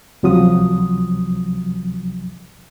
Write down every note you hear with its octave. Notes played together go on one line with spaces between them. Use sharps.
C#2 C3 F3 F#3 D#6